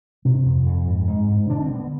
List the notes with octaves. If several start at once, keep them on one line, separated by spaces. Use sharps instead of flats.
C3 C4
F2
F2
G#2
G#2
G#2
D3 D4
C4
D3 B3